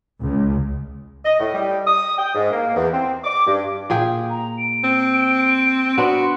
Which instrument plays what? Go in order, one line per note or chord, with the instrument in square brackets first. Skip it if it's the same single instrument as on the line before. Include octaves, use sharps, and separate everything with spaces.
[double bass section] C#2
[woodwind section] D#5
A2
G3
D#6
G5
G#2
A#3
E2
C4
D6
G2
[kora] A#2 G#4 G5
[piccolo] A#5
D7
[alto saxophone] C4
[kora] B3 D4 [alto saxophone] F#4 [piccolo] C6